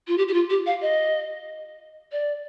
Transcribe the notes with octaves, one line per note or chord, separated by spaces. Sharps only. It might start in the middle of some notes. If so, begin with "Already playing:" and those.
F4
G4
G4
F4
G4
F5
D#5
D5